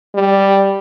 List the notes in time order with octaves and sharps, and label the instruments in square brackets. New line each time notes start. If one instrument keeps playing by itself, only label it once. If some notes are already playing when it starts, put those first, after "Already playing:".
[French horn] G3